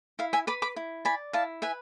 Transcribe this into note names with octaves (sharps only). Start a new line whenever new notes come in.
E4 F5
E5 G#5
B4 B5 D6
B5 D6
E4
D5 G#5 B5
E4 F5 A5
B4 E5 G#5